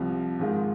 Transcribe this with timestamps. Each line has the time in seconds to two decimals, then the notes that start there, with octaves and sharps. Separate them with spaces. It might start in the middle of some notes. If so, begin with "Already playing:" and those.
Already playing: C2 C3 F3
0.39 G#2 D#3 G#3 F4